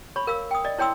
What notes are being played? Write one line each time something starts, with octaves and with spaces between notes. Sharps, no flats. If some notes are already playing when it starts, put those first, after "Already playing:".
C#5 B5 C#6
A#4 F5 E6
G5 D#6
D5 D#5
E4 C#5 G5 C6 E6